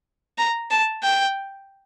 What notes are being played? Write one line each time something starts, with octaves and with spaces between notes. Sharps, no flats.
A#5
A5
G5